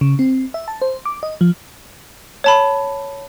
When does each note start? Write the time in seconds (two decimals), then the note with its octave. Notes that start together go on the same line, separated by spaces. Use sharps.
0.01 C#3
0.19 C4
0.54 E5
0.68 A5
0.82 C5
1.05 D6
1.23 D#5
1.41 F3
2.44 C#5 A5 B5